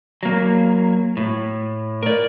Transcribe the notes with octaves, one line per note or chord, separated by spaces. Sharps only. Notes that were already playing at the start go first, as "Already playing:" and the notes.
F#3 A#3
A2
A#4 D5